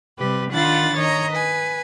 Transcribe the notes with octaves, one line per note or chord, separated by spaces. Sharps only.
C3 G3 G4 B4
D#3 D4 F4 F#5 B5 A6
D#3 C#5 D#5 A#5
B4 G#5